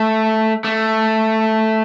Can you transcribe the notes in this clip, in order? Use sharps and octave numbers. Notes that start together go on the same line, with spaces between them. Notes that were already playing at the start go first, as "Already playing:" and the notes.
Already playing: A3
A3